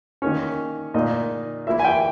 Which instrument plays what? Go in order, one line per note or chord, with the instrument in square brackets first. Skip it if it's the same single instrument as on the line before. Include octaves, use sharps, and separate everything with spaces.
[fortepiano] D#3 A#3 C#4 C#5
A#2 A#3 D#4 D#5
E3 A#3 E4 E5
G#5
G5